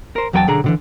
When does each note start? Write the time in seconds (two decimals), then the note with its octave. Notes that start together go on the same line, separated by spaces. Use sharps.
0.16 A#4 C5
0.33 E2 F#3 F4 A#4 G5 A5
0.47 B1 D3 G#4 A#5
0.64 B2 D3 E3